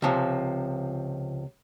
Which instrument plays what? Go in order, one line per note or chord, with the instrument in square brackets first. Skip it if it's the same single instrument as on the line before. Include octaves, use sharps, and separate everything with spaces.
[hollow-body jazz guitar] C#2 C3 F3